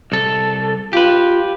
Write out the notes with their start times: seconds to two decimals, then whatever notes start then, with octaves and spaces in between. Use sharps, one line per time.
0.12 C2 A4
0.93 F4 G4 B4